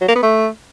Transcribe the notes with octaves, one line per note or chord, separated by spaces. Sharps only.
F#3
A#3
B3
A3